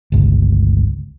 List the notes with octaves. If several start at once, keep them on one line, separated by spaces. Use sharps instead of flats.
G1 C#2